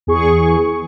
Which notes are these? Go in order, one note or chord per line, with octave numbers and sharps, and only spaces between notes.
E2 G#4 C#6